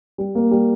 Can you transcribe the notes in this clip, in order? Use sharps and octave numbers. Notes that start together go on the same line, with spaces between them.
G3
A#3
G3